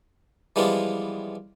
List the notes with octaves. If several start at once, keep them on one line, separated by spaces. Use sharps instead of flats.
E3 F3 G3 G#3 B3 F4